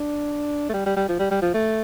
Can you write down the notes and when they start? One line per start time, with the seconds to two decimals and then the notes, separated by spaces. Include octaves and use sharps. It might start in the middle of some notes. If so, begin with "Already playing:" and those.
Already playing: D4
0.69 A3
0.74 G3
0.86 G3
0.96 G3
1.09 F3
1.19 G3
1.31 G3
1.42 F3
1.54 A3